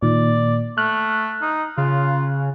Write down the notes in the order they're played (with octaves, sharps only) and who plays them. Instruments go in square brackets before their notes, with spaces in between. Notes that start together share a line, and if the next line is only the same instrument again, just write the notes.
[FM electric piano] A#2 D#3 [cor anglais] D5
[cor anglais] A3 [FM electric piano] F6 F#6
[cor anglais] D#4
[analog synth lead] C#3 [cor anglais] F4